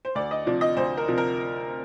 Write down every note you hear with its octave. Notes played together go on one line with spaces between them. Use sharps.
C5
D2 D5
D#5
C3 F3 D5
D#5
D2 C5
A#4
C3 F3
A#4